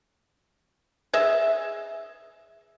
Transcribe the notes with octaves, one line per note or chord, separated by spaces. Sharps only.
G#4 D#5 E5